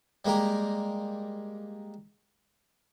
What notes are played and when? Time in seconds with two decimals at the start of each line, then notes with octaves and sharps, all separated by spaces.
0.25 G3 G#3 A#3 G4 A#4